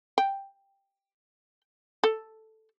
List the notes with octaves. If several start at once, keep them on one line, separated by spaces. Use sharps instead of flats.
G5
A4